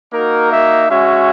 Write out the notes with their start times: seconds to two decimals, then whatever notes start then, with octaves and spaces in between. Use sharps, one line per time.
0.12 A#3 D#4 F#4 A#4
0.50 E5
0.89 G#3 C#4 F#4 E5